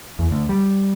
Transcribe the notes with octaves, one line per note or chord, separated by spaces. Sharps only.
E2
D2
G3